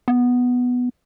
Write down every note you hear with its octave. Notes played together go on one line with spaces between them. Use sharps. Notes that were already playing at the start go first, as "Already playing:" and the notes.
B3